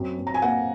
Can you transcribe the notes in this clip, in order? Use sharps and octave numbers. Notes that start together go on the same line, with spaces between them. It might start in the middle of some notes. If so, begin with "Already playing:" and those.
Already playing: F#2 C4
F#2
A#5
G#5
A#3 F#5